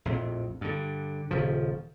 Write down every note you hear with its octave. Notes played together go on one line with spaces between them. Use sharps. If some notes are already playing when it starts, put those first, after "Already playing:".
A#1 F2 A2
G2 D3
D#1 C#3 F3